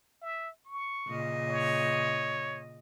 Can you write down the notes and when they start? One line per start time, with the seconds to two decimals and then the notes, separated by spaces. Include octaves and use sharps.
0.22 E5
0.66 C#6
1.08 A#2 C#3 D#5
1.49 C#5